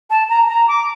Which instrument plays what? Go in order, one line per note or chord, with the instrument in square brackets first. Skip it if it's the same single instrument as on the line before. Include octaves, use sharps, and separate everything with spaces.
[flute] A5
A#5
A#5
D6